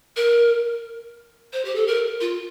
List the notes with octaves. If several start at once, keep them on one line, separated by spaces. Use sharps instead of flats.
A#4
C5
G4
A4
A#4
F4